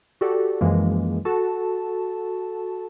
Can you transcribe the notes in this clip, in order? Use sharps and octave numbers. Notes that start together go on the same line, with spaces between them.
F#4 G4 A4 D5
F#2 E3 F3 G#3 A#3
F#4 A4 A5